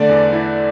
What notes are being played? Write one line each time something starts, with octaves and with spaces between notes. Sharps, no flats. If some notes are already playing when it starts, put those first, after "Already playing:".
Already playing: D3 A3 D5
E2
E4